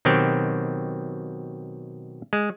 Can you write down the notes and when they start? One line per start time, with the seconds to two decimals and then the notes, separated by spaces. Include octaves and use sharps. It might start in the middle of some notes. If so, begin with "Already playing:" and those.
0.05 B2 D#3 F#3 C4 G4
2.33 G#3